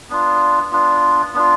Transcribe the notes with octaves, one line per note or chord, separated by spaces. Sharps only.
B3 D4 F4
B3 D4 F4
B3 D4 F4